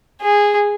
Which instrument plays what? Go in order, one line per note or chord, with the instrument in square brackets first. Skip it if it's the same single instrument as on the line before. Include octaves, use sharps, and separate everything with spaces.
[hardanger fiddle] G#4